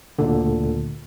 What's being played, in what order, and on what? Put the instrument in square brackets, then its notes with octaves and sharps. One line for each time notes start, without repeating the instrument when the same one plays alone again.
[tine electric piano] D2 A#2 D3